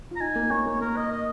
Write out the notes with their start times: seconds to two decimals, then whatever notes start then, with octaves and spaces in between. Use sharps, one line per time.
0.11 F4
0.16 A#5
0.20 D#4 G#5
0.36 A#3
0.51 A#3 C#5
0.66 A#3
0.81 A#3 A#4
0.96 D#5
1.12 D#5